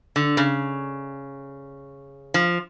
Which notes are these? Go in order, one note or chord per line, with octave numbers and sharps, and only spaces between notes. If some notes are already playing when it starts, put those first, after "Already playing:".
D3
C#3
F3